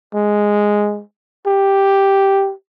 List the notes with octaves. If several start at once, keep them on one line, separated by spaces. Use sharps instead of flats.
G#3
G4